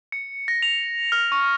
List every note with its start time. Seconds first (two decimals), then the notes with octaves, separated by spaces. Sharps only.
0.12 C#7
0.48 A#6
0.62 F7
1.12 F6
1.32 C#6